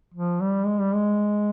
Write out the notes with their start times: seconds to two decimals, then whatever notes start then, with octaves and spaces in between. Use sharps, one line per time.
0.14 F3
0.41 G3
0.66 G#3
0.80 G3
0.94 G#3